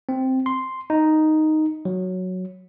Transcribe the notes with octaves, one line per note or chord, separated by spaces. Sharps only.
C4
C6
D#4
F#3